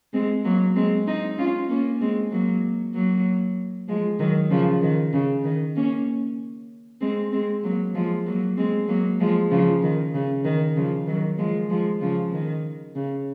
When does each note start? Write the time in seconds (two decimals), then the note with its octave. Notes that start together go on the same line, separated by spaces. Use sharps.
0.13 G#3 C4
0.44 F#3 A#3
0.75 G#3 C4
1.07 C4 D#4
1.38 C#4 F4
1.70 A#3 C#4
2.01 G#3 C4
2.31 F#3 A#3
2.94 F#3 A#3
3.88 F3 G#3
4.19 D#3 F#3
4.51 C#3 F3
4.82 D#3
5.13 C#3
5.44 D#3
5.75 A#3 C#4
7.01 G#3 C4
7.32 G#3 C4
7.63 F#3 A#3
7.95 F3 G#3
8.26 F#3 A#3
8.57 G#3 C4
8.88 F#3 A#3
9.20 F3 G#3
9.51 C#3 F3
9.83 D#3
10.14 C#3
10.45 D#3
10.76 C#3 F3
11.07 D#3 F#3
11.38 F3 G#3
11.70 F3 G#3
12.01 C#3 F3
12.32 D#3
12.95 C#3